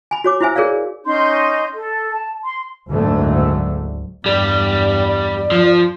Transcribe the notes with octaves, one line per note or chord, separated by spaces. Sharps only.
G#5 B5
F#4 C#5 D6
E4 F#4 C5 E5 G#5 E6
F#4 G#4 A#4 C#5 D5 F5
C#4 D#4 C6 G6
A4
A5
C6
F#1 D2 G#2 D3 A3
E2 G2 G3 D5
D5
F3